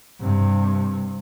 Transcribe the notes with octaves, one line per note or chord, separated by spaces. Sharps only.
G2 C3